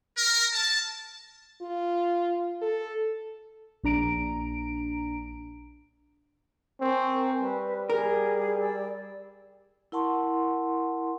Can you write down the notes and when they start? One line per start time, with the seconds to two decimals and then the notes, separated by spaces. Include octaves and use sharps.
0.17 A#4
0.54 A5
1.62 F4
2.62 A4
3.83 A#1 D4 A#5 D7
6.81 C4 A#4 G#5 C#6
7.41 G3 B4
7.90 G#4 A#4
8.61 D5 E6
9.92 E4 A#4 F#5 A5 C6 C#6